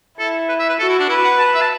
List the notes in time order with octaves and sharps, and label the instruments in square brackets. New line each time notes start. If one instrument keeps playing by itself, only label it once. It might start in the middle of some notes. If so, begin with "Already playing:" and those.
[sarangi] E4 [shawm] A4
[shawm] B4
E5
B4
[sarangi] F#4 [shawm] A4
[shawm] E4
D4
[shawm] E4 [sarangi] B4
[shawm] F#5
A5
E5
A5